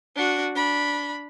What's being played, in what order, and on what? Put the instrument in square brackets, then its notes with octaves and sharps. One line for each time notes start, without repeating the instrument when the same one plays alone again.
[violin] D4 F#4
D4 B5